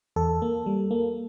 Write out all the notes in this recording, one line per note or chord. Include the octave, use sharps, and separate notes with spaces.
E2 A4
A#3
G3
A#3